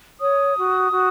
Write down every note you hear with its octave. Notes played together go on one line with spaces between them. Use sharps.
C#5 D#6
F#4
F#4